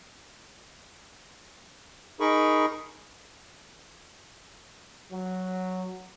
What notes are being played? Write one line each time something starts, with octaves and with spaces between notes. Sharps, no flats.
D#4 G#4 A#4 B5 C#6
F#3